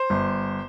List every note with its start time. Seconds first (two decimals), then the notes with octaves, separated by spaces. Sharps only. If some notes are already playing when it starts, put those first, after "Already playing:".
Already playing: C5
0.10 G1